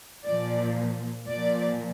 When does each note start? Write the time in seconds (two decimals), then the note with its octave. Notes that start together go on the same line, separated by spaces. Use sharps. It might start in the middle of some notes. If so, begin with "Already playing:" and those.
0.25 A#2 F3 D5
1.28 A#2 F3 D5